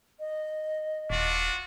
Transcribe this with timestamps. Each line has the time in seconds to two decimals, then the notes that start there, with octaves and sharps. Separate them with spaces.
0.20 D#5
1.10 D#1 D4 F4 F#4